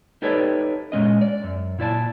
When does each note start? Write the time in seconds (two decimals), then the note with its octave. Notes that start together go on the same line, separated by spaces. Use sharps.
0.22 D#4 G4 A4 B4 C#5 D5
0.92 A#2 G#3 C#4 D#5
1.21 D5
1.44 F#2
1.79 A#2 E4 D5 A5